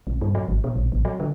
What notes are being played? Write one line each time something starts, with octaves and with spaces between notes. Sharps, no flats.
B1
G2
F#3
G#1
B2
A#1
A1
F#3
D3